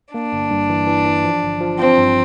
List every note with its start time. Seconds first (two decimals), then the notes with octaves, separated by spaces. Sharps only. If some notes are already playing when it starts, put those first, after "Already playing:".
0.14 A#3 D4
0.32 G1
0.51 G2
0.69 E3
0.87 E3
1.06 E3
1.24 F3
1.43 G1
1.61 F3
1.79 F3 C4
1.98 G2